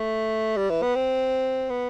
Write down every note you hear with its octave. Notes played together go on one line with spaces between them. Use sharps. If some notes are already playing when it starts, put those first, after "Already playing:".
Already playing: A3
G3
E3
B3
C4
B3